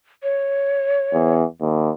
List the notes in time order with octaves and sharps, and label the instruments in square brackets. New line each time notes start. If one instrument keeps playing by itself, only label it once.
[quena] C#5
[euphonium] E2
D#2